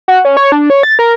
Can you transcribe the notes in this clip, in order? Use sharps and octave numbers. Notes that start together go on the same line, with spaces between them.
F#4
C#4
C#5
D4
C#5
A6
A#4